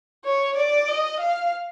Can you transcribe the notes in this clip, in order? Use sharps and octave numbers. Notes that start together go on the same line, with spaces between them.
C#5
D5
D#5
F5